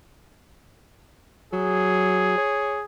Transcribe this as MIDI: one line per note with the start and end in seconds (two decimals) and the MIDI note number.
1.53 2.33 54
1.53 2.85 68
2.38 2.78 73